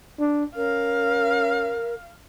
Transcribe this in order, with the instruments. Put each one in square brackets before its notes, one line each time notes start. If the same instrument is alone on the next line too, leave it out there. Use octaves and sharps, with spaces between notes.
[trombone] D4
[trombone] C#4 [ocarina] A#4 [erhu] F5